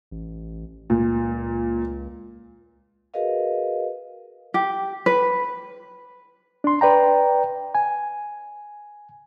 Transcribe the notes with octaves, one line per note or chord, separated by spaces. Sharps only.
A1
C#2 A#2
F#4 G#4 A#4 B4 D#5 F5
G4
B4
D4 C6
B4 D5 G5 A#5
G#5